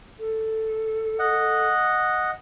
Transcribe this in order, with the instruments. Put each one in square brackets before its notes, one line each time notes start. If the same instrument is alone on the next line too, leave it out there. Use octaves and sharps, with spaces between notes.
[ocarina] A4
[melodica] D#5 F#5